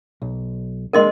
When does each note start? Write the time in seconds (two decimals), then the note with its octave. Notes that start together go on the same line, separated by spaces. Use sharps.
0.22 B1
0.93 G#3 A#3 D4 A#4 D#5 C6